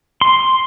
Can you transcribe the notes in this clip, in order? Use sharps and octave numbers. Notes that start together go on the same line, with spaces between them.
C6